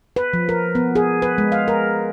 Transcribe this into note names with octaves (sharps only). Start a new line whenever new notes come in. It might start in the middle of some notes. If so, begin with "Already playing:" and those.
B4
F3
A#4
B3
G#4
B4
G#3
F5
A#4